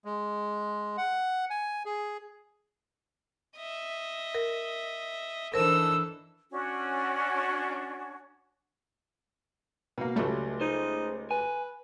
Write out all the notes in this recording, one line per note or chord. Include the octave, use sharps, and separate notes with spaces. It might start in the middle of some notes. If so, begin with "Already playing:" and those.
G#3
F#5
G#5
G#4
D#5 E5
A#4
E3 D4 D#4 A4 A#4 C5 E6
C#4 D4 F#4
B2 A#3
C#2 F#3 G3 A3
D#4 G#4 C5
B4 G#5